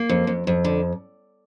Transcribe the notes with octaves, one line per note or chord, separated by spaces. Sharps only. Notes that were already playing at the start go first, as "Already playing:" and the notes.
Already playing: A#3
F2
F2
F2
D3